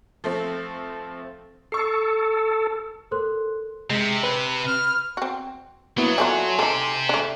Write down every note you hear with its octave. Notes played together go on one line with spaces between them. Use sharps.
F3 A3 C4
A4 C#6 C7
A4 A#4 C5 C6 F#6
C3 G#3
B4 F#7
F6
C4 F#4
F#3 A#3 B3 E4
F3 A3 D4 G#5 C6
D#4 G4 A4 C5
A3 D4